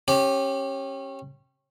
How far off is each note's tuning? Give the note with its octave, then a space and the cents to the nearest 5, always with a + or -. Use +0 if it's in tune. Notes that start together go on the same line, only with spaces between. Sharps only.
C#4 -25 G4 +0